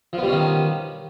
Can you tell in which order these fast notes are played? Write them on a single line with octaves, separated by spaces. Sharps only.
F3 B3 G3 C#4 D#3